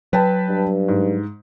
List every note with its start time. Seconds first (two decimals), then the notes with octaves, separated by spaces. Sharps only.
0.13 F#3 B4 G5 A5
0.49 G2
0.88 G#2